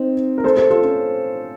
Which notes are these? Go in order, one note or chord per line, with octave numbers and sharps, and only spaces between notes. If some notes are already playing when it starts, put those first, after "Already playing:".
Already playing: C4 D#4
A#4
A4 C5
A4 C5
F4 A4
C#4